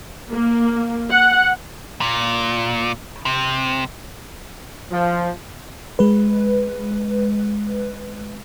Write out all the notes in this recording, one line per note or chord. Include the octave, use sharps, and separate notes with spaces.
A#3
F#5
A#2
C3
F3
G#3 B4